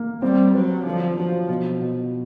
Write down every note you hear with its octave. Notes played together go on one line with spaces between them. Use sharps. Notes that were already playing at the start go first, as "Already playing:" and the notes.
Already playing: A#3
G3 C4
F#3 B4
D3 F3
F3 F#3
B2
B2